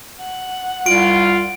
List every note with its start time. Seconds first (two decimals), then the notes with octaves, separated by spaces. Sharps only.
0.21 F#5
0.86 C2 F4 D7